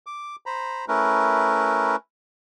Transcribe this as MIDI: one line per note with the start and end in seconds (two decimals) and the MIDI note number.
0.06 0.36 86
0.46 0.85 72
0.46 0.85 82
0.46 0.85 83
0.88 1.96 57
0.88 1.96 61
0.88 1.96 64
0.88 1.96 70
0.88 1.96 71